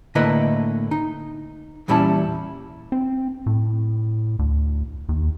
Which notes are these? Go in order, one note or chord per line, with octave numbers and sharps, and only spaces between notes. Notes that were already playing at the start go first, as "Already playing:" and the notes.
A2 D3 A#3 E4 B4 D#5
D#4
E2 A#2 G3 C#4 E4 A5
C4
A2
D2
D#2